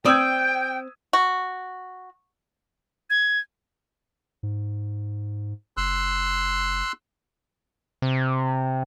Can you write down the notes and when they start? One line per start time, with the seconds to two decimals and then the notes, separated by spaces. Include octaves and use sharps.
0.05 C4 D5 G5 D#6 E6 G#6
1.13 F#4
3.10 G#6
4.43 G#2
5.77 F#1 C6 E6 F#6
8.02 C3